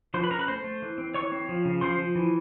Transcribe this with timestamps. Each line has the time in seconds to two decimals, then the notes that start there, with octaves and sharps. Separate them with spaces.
0.14 F3 C5 C6
0.23 B4 B5
0.31 C#4 A#4 A#5
0.39 B4 B5
0.48 A3 C5 C6
0.64 A3
0.82 E3
0.98 C4
1.14 E3 C#5 C#6
1.32 C4
1.49 F3
1.65 C#3
1.81 F3 C5 C6
1.98 F3
2.15 E3